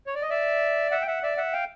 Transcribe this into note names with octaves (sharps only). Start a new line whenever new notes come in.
C#5
D5
D#5
D5 E5
E5 F#5
G5
E5 F#5
D5 E5
E5 F#5
F5 G5